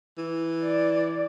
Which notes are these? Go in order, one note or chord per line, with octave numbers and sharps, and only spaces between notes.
E3
D5